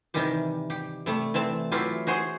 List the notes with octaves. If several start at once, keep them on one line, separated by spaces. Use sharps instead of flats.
C3 D#3 E3 G3 G4
G4
C3 G3 A3
E3 C4 A5
E3 F#3 E4 F4 G4
F#4 G#4 C5